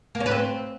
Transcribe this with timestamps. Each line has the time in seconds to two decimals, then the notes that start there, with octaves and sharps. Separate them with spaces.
0.15 A#3
0.20 C#4
0.26 B4
0.31 C4